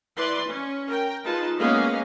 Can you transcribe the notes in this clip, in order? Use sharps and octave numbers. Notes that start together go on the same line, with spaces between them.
E3 B4 D5 C6
C#4
A#4 G5
G#3 D#4 F4 B4 A5
G#3 A#3 B3 C#4 D#5 F5